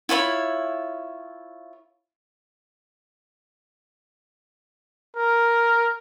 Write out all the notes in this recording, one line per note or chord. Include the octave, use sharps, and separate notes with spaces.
E4 F4 C#5 B5
A#4